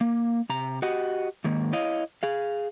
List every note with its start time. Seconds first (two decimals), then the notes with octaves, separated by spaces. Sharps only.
0.01 A#3
0.49 C3 A#5
0.82 F#4 G4 D#5 F#5
1.44 G#2 D#3 A#3
1.73 E4 C#5 D#5 F5
2.23 G#4 F5